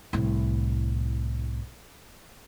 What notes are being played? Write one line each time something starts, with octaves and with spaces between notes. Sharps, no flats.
C2 A2